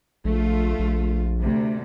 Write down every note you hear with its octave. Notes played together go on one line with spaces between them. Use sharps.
A#1 A3 F4
A#1
D2 C3